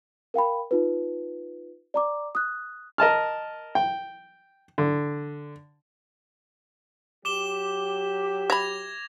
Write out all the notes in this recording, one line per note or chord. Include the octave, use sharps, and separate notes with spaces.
A#4 F5 G5 B5
D#4 F4 B4
D5 A#5 D6
D#6 F#6
A#4 D#5 A5 F6
G5
D3
F#3 G4 D6 E7 G7
E5 B5 G#6 A#6 F7